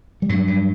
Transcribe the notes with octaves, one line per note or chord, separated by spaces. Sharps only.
G3
G2 F#3
G2